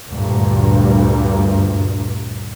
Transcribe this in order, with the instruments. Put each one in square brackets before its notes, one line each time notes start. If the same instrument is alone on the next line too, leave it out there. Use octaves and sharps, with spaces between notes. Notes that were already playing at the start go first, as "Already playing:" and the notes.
[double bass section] D2 G2 A#2